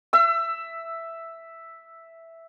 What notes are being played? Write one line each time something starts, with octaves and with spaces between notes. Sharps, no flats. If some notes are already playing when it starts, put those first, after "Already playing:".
E5 E6